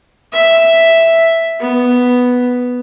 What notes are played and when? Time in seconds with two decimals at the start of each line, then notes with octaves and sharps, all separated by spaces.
0.33 E5
1.60 B3